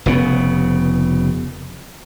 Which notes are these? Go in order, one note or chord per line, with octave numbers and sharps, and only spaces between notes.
F1 C#3 B3